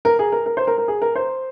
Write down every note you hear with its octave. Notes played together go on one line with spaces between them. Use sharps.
A#4
G#4
A#4
A#4
C5
A#4
A#4
G#4
A#4
C5